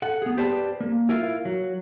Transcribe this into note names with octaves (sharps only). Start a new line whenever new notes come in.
A4 F#5
B3 G#4
G4 B4 C5 D5 A5
A#3
E4 F4 A#4 E5 F5
F#3